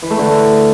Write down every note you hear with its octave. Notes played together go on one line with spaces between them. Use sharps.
E3
A3
D3